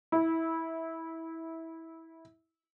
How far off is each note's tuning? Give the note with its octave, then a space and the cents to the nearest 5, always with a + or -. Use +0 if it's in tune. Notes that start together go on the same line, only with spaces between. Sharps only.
E4 -20